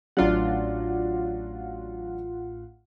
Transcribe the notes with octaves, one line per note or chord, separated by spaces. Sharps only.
A1 F#3 D4 F4 D5 F#5